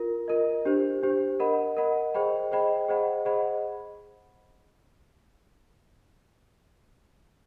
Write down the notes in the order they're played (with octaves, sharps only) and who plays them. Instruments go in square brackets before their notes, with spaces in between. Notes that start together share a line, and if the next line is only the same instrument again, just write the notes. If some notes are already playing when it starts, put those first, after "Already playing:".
Already playing: [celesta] F4 A#4
F4 A#4 D#5
D4 G4 C5
D4 G4 C5
A#4 D#5 F#5 B5
A#4 D#5 F#5 B5
G#4 C5 D#5 G5 B5
G#4 C5 D#5 G5 B5
G#4 C5 D#5 F#5 B5
G#4 C5 D#5 F#5 B5